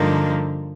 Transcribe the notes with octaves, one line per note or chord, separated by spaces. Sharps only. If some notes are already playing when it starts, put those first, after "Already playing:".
Already playing: G2 D3 F3 A#3 D#4